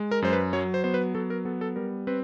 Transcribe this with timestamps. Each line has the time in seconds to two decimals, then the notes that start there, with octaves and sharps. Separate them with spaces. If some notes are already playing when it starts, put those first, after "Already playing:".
Already playing: G#3
0.11 A#4
0.22 F#2 C5
0.33 B4
0.53 F#3 C#5
0.74 C5
0.84 B3 C5
0.94 B4
1.15 F#3 A4
1.30 A#4
1.45 B3 A4
1.61 A4
1.76 G3 A#4
2.07 C4 B4